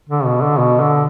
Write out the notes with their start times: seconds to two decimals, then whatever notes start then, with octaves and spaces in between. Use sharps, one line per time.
0.09 D3
0.25 B2
0.42 D3
0.59 B2
0.80 D3